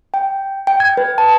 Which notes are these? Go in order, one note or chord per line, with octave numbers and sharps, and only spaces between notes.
G5
G5
G#6
B4
A5